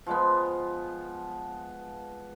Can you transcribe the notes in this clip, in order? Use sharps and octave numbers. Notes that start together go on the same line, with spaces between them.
F3 G#3 B3